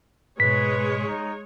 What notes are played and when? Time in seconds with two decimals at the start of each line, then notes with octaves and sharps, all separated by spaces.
0.40 G#2 B2 G#3 B4 C#5 B6
1.07 D#4